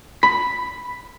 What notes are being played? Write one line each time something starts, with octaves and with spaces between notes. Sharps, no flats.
B5